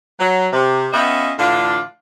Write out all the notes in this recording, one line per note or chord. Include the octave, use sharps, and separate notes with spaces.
F#3
C3
B3 C#4 F4 D#5 E5 G5
A2 D3 E3 D4 F4